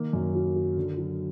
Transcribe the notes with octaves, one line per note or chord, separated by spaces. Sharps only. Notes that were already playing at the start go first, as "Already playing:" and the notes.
Already playing: D#3 A#3
F#2
F#3
F#3
D3
F#3